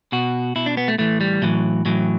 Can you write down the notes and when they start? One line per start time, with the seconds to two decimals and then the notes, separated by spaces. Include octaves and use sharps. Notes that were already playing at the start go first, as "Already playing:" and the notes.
0.12 B2 F#4
0.56 B2 E4
0.66 D4
0.77 B3
0.88 A3
0.98 A2 E3 A3
1.21 G3
1.42 A2 E3 F#3
1.86 A2 E3 F#3